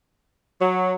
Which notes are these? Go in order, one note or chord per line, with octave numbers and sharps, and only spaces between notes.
F#3